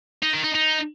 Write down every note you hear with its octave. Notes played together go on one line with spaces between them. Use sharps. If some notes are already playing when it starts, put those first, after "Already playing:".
D#4
D#3
D#4
D#4